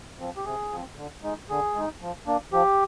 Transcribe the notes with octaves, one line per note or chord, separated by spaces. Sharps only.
F3 C4
G4
C3 G#4
F3 C4
D3
G#3 D#4
D3 G#4
G#3 D#4
F3
A#3 D4
F3 G4